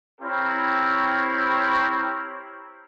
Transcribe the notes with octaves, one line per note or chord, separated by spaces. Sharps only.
C4 E4 G4 A#4 C#5